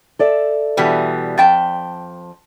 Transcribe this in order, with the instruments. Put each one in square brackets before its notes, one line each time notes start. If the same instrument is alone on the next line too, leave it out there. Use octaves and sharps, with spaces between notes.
[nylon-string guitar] A4 D5 E5
[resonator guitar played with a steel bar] B2 E3 G3
F2 G5 A5